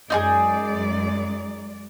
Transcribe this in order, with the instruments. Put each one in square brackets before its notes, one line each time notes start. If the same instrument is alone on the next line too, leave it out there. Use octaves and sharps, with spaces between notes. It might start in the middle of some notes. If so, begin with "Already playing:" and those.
[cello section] F#2 G#3 D5 [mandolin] D#4 F4 G#4